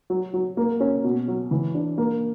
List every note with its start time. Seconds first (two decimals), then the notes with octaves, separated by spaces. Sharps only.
0.10 F#3
0.34 F#3
0.57 A#3
0.80 C#4
1.04 B2
1.28 F#3
1.51 E3
1.75 D4
1.98 A#3